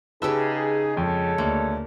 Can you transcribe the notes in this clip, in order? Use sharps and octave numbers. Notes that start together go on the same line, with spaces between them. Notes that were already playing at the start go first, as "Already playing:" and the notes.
C#3 D#4 G4 G#4 B4 E5 A5 E6
F2 G#3 A4 C#5
D2 A#3